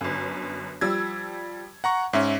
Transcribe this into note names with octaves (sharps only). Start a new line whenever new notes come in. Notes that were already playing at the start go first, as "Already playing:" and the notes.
G1 F#2
F3 G3 E6 G#6
F#5 A#5 C#6
G#2 C#4 E5